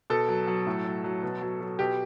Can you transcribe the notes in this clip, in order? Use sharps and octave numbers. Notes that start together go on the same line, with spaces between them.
B2 A4
F#3
F#3
A2
F#3
F#3
B2
F#3
F#3
B2 G4